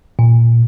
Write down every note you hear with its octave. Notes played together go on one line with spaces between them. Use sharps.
A#2